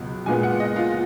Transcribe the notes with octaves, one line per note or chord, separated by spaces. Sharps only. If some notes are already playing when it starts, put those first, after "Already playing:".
Already playing: C#2 B2 F#3
A#2 G#3 B3 G#5
F#5
D#5
F4